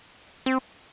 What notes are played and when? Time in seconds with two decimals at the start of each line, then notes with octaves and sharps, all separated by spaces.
0.46 C4